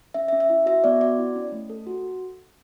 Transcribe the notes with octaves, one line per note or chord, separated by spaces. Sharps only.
C#4 E5
E5
C#4
E5
E4
F#4 E5
B3 D5
F#4 D5
E4
C#4
A3
A4
F#4